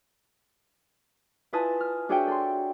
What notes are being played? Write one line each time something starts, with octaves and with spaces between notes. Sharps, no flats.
E4 F4 B4 G#5 A5 D#6
F6
D4 F#4 G#4 C#5 E5 G5
A4 C6